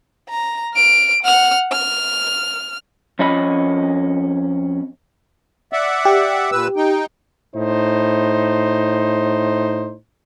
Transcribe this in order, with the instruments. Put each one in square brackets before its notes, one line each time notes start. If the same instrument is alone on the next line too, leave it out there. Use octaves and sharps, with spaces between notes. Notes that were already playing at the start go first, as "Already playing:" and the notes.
[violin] A#5
F6 D7
F#5 F6
F6
[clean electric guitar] F2 C#4 D#5 B5
[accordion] D5 E5 F#5
[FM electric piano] G4
[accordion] A#2 B4 E6
D#4 G5
[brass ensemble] A2 D#4 C5